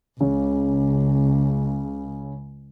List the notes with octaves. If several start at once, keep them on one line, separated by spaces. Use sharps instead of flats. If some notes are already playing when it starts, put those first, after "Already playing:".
C#2 C#3